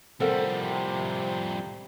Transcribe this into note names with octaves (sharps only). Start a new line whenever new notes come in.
C3 F3 G3 C4 A4 A#4 F#5